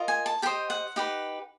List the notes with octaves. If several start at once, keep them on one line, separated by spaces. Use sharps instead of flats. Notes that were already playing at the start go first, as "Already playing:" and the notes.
Already playing: F4 A#4 D#5
G#5
A5
G4 C5 D#5 G5
F#5
D#4 G4 B4